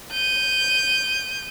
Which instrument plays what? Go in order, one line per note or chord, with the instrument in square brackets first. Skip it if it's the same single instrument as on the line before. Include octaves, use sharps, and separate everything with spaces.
[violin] G6 D#7